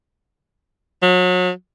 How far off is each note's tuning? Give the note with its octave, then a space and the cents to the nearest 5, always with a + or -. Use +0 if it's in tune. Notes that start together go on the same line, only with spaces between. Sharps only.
F#3 -30